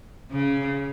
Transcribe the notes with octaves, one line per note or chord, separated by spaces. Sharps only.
C#3